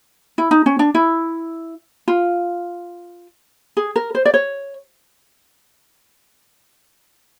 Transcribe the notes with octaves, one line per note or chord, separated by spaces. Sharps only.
E4
D#4
C#4
D4
E4
F4
G#4
A#4
C5
D5
C#5